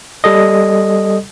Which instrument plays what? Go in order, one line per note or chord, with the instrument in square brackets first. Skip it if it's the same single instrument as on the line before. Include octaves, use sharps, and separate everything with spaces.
[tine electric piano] G3 A4 D#5